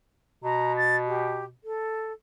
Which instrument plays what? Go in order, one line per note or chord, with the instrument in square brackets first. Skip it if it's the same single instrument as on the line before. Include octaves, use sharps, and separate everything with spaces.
[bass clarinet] B2 [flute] A#5
[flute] A6
G4
A4